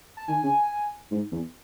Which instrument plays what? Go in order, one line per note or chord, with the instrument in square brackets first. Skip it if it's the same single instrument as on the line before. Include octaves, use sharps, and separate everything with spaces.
[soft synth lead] A5
[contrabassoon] D#3 [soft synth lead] G#5
[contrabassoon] C#3
G#2
E2